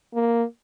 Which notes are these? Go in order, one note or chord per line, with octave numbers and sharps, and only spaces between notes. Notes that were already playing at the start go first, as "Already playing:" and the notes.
A#3